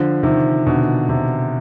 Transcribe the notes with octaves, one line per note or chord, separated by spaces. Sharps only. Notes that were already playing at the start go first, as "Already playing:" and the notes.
Already playing: D3 F3
C3 D#3
B2 D3
C3